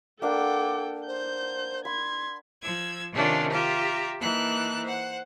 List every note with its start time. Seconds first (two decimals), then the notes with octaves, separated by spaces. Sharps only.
0.22 A#3 D4 A4 F#5 G5 D6
1.08 C5 G6
1.85 B5 C6 G#6
2.63 F3 E6 G#6
3.13 C3 D#3 A3 C#4 D4 F4
3.52 F4 G4 E5 A#5
4.20 E3 A#3 D#4 A5 F#6
4.83 C5 F#5